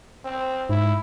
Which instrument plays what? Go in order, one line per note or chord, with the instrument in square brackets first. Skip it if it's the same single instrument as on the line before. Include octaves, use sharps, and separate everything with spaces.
[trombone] C4
[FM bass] G#2 [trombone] E4